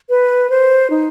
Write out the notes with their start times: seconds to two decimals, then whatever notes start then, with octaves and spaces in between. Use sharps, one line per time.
0.09 B4
0.50 C5
0.90 D#4